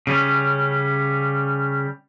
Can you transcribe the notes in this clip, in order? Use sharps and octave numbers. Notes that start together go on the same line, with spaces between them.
C#3 G3 C#4